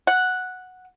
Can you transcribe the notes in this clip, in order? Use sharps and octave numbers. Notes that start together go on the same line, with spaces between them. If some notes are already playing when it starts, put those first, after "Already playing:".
F#5